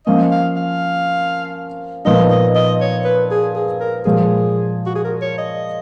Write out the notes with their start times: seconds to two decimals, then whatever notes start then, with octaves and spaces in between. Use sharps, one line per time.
0.06 F3 A#3 C#4 D#5
0.31 F5
0.56 F5
2.05 A#2 F3 B3 D#4 D#5
2.30 D#5
2.55 D#5
2.81 C#5
3.05 B4
3.31 G#4
3.55 G#4
3.80 A#4
4.05 A#2 F3 G#3 G#4
4.86 F#4
4.95 G#4
5.04 A#4
5.22 C#5
5.38 D#5